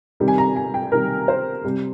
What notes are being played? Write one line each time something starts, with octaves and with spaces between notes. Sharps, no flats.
C3 D#3 G3
G#5
A#5
G#5
G5
C3 D#3 G3 A#4
C5
C3 G3